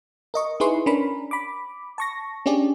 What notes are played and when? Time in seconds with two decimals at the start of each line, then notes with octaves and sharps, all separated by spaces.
0.34 A#4 D#5 C#6
0.60 D#4 E4 G#4 B4 C6 C#6
0.86 C#4 D4 A#4 B5
1.31 B5 D6
1.98 A5 C#6 A#6
2.46 C#4 D4 G4 G#4 D5